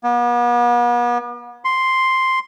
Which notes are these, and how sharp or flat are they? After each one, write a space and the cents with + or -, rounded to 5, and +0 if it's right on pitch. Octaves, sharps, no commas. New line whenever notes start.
B3 -40
C6 +0